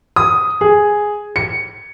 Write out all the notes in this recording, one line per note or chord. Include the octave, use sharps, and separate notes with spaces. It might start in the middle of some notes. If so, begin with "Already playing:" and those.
D#6
G#4
C#7